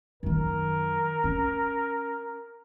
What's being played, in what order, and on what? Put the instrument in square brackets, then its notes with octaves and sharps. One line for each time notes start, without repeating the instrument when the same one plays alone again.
[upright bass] F#2 D#3 [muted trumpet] A#4
[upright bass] C#4